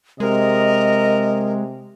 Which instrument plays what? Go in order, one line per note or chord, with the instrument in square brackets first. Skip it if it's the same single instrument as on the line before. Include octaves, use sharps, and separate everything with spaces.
[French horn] C3 [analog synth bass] G#3 [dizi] A#4 [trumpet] D#5